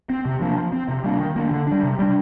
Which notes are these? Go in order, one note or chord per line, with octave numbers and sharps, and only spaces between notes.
C4
C3
F3 A#3 D4
F3
C4
C3
G3 A#3 D4
D#3
A#3 D4
D3
G3 D4
C3
G3 D4